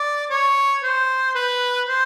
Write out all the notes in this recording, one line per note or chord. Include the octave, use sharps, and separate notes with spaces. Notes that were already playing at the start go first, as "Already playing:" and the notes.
Already playing: D5
C#5
C5
B4
C5